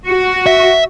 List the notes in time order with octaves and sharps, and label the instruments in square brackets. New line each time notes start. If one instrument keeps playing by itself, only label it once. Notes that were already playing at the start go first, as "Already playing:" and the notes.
[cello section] F#4
[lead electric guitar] E5